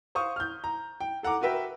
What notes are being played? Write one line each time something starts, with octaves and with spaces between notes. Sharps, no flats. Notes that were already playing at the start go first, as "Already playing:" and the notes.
C5 F5 C#6 D#6
F6 G6
A#5
G5
A4 F#5 A#5 D6
F#4 A#4 B4 E5 G5